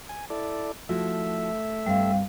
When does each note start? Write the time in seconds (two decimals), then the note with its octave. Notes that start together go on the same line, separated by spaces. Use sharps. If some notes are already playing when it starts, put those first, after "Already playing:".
0.09 G#5
0.30 E4 A4 D5
0.89 F3 A3 E4 F#4 E5
1.87 G2 G3 C4 F5